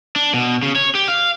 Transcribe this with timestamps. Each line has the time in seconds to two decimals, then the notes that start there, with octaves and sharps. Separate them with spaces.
0.16 D4
0.34 B2
0.63 C#3
0.76 C#5
0.95 G4
1.08 F5